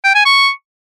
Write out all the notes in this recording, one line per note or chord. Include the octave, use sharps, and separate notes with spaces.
G5
G#5
C#6